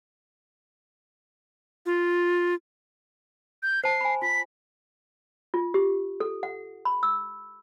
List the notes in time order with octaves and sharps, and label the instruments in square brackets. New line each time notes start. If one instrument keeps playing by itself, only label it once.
[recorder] F4
[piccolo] G6
[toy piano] C5 A5 [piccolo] C7
[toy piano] G#5 B5
[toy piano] F4 [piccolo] B6
[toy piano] F4
G4
A4
F#5
B5
E6